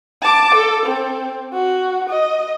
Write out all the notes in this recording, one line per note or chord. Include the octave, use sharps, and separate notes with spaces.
A5 D6
A4
C4
F#4
D#5